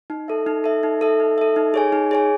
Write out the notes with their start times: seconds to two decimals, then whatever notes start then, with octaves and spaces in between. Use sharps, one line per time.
0.10 D#4
0.28 A4 E5
0.46 D#4
0.64 A4 E5
0.83 D#4
1.01 A4 E5
1.20 D#4
1.38 A4 E5
1.56 D#4
1.74 G#4 C#5 G#5
1.93 D#4
2.11 G#4 C#5 G#5